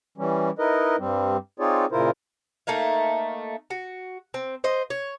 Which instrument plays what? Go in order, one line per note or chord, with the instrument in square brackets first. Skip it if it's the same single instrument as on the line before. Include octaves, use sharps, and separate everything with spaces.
[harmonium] E3 G3 C#4
D#4 E4 A#4 B4 D#5
G2 G3 C4
C4 D#4 F4 G#4 C#5 D5
A#2 C#3 E4 F4 A#4 C5
[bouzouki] A3 A#3 D#4 F5
F#4
C4
C5 D#5
C#5